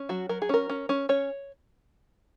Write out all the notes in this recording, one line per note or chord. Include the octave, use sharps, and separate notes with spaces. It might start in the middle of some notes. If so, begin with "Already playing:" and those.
Already playing: C#4
F#3 F#4
F#3 A#4
G#4
C#4 A#4
C#4
C#4
C#4 C#5